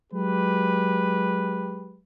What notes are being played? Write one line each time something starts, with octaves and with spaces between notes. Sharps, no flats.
F#3 G#3 G4 B4